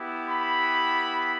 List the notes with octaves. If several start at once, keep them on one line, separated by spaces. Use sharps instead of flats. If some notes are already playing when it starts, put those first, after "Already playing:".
Already playing: B3 E4 G4
B5